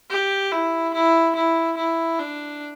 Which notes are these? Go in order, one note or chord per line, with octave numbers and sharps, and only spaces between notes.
G4
E4
E4
E4
E4
D4